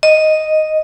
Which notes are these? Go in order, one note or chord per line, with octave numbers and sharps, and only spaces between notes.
D#5